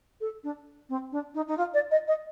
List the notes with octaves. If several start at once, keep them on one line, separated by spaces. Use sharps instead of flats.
A4
D4
C4
D4
D#4
D#4
F4
D5
D#5
D#5